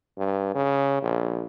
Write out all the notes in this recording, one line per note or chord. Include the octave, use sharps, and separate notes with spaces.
G2
C#3
A#1